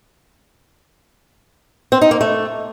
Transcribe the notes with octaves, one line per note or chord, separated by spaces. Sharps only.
C4
D#4
A#3
A3